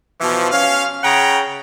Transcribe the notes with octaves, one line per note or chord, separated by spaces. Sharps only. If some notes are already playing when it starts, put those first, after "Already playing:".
B2 E3 F3
C#4 F5
C#3 F#5 G5 A#5